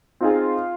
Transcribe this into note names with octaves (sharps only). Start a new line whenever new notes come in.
C4 D#4 F4 G#4